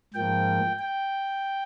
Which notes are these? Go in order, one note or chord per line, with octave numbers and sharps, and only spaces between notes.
G#2 F3 A#3 G5
G5